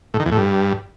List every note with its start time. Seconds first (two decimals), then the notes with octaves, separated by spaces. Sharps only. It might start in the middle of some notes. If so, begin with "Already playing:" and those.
0.14 A2
0.20 D#3
0.26 E2
0.31 A2
0.37 G2